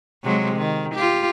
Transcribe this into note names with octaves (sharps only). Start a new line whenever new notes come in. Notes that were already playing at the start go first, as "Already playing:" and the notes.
C3 F#3 G#3
D#3
F4 G4